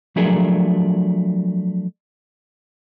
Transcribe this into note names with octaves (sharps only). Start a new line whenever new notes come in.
F3 F#3 A3 D4 G#4 A#4